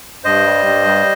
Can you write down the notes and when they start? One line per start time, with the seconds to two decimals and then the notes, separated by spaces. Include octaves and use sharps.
0.24 G2 C5 D#5
0.45 G3
0.66 G2
0.87 G3